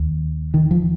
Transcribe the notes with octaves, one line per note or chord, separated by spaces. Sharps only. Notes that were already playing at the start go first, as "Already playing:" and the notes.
Already playing: D#2
D#3
F3